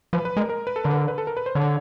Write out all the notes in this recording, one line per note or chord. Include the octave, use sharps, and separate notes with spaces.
F3 B4
B4
G#3 A#4
A#4
B4
A4
D3 A#4
B4
A#4
B4
A4
A#4
B4
C5
D3 C#5